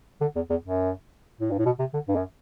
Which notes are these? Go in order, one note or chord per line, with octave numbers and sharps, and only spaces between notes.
D3
E2
E2
F#2
A2
G2
A2
B2
C3
D3
G2
F#2